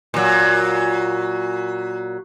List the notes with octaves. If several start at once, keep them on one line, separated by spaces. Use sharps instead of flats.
A#2 F#3